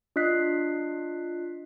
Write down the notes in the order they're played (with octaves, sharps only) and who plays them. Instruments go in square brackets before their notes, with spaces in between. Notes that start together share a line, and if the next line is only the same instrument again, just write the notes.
[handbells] D4 F4 D#5 F#6 B6 C7